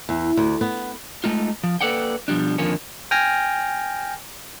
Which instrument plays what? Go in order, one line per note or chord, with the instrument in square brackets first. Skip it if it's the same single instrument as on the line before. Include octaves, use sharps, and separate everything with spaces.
[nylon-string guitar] E2
D2
B3
[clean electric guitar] G#3 A3 D#4 F4
F3
A#3 A4 B4 D5 F#5 G5
B2 F3 G3 D4
F2 D3 D#3 F3 A#3 C#4
[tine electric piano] G5 G#5 F6 A#6